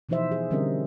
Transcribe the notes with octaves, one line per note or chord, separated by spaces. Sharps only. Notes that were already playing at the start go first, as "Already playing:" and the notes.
B2 E3 F3 D#4 C5 E5
G#4
D3 G3 C4 C#4 A#4 D#5